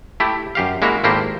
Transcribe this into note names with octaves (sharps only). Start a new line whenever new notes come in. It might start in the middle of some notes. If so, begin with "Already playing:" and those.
A3 E4 G4
F#2 G4 F5
G#3 A#3 E4 F#4 A#4
G#1 A3 A#3 E4 G4 C5